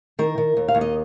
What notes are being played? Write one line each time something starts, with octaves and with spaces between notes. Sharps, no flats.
D#3 A#4
D#3
D#2
F5
D#2
D#5